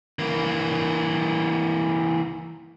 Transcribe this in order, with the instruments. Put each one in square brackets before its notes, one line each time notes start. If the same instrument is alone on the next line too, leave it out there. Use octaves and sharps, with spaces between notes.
[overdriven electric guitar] E3 A#3